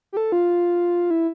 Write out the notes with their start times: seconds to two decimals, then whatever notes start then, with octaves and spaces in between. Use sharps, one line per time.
0.13 G4
0.17 A4
0.32 F4
1.11 E4